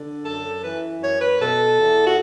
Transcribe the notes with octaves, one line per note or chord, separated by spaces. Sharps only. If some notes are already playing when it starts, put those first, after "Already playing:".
Already playing: D3
F#2 A4
E3 B4
F#2 C#5
B4
B2 A4
E2
F#4